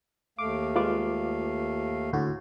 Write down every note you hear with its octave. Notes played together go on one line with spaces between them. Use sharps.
D#2 A3 F5 D6
G#3 F4 B4 D6
D2 A2 F#4